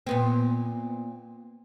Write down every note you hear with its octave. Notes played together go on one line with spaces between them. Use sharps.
A#2 B3 C4